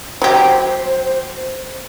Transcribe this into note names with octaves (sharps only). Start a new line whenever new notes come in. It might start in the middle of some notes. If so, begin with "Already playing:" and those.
F#3 G4 C5